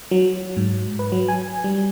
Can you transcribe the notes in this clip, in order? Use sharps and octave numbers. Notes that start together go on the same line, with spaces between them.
F#3
G#2
B4
F#3
G#5
G3